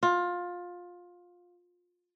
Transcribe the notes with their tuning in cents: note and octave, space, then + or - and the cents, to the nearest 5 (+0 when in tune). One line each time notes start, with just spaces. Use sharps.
F4 +20